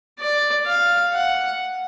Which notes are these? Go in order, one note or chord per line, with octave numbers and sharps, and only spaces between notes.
D5
F5
F#5